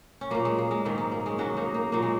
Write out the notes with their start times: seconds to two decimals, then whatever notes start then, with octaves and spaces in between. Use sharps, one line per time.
0.21 C#4
0.30 A#2 F#3 A#3
0.45 G#3
0.58 A#3
0.71 G#3
0.85 G#2 D#3 F#3 A#3
0.98 G#3
1.11 A#3
1.26 G#3 C#4
1.38 G#2 F#3 C#4 F#4
1.57 A#3 D#4
1.74 A#3
1.92 A#2 F#3 A#3
2.02 G#3